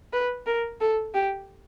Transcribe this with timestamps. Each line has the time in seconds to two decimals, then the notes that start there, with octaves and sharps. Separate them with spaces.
0.13 B4
0.46 A#4
0.81 A4
1.14 G4